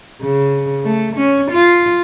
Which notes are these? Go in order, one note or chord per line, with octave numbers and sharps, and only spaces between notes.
C#3
A3
C#4
F4